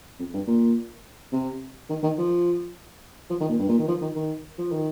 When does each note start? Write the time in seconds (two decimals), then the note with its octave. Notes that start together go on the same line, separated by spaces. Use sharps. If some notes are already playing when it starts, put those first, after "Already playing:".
0.19 F2
0.34 G2
0.47 A#2
1.32 C3
1.89 D#3
2.03 D#3
2.18 F3
3.30 F3
3.40 D#3
3.49 A#2
3.59 G2
3.69 A#2
3.78 D#3
3.88 F3
4.01 D#3
4.15 D#3
4.58 F3
4.72 D#3